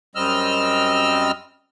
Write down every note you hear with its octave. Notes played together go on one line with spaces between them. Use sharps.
F#2 G3 C4 D#5 E6 F6